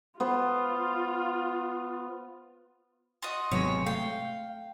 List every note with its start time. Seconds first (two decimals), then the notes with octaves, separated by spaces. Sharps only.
0.20 B3 F4 C5
3.22 F4 F#4 D#5
3.52 G#1 C3 F#3 G#3 B3 C#5
3.86 A3 F5 G5